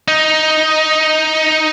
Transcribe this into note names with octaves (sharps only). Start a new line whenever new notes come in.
D#4